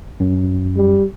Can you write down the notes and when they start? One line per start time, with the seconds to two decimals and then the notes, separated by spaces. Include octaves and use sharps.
0.20 F#2
0.76 G3